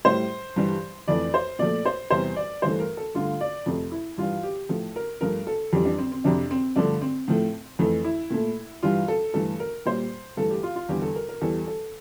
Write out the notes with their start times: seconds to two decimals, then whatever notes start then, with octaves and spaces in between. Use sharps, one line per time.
0.05 A2 G3 C5
0.56 G2 E3 G3
1.08 F2 E3 A3 D5
1.34 C5
1.59 A#2 F3 A3 D5
1.86 C5
2.11 E2 C3 G3 C5
2.36 D5
2.62 G2 E3 A3 C5
2.80 A#4
2.97 A4
3.15 G2 D3 A3 F4
3.41 D5
3.66 F2 C3 F3 A3
3.91 E4
4.18 G2 E3 G3 F4
4.43 G4
4.69 A2 F3 A3 A4
4.96 A#4
5.21 G2 F3 A3 A#4
5.47 A4
5.73 F2 E3 G3 G4
5.85 D4
5.99 C4
6.12 C4
6.24 F2 C3 F3 D4
6.51 C4
6.76 G2 D3 F3 A3 D4
7.02 C4
7.28 A2 F3 A3
7.79 F2 E3 A3
8.05 E4
8.30 A#2 A3
8.83 G2 E3 G3 F4
9.08 A4
9.34 G2 E3 A3 A4
9.60 A#4
9.86 A#2 G3 C5
10.37 G2 E3 A3 A4
10.51 G4
10.63 F4
10.76 F4
10.89 E2 D3 G3 G4
11.02 A4
11.15 A#4
11.29 A#4
11.41 E2 E3 G3 A4
11.67 A4